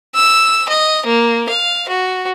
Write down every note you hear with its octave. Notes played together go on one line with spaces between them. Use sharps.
E6
D#5
A#3
F5
F#4